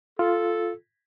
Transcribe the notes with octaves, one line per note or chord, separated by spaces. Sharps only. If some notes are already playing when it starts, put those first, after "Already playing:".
F4 A4